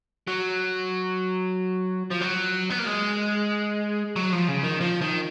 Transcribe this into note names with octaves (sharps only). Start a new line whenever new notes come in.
F#3
F3
F#3
B3
A#3
G#3
F#3
F3
C#3
D#3
F3
D#3